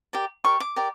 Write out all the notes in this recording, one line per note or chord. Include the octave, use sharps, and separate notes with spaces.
G4 A#4 D5
G4 A#4 D5 C#6
D6
G4 A#4 D5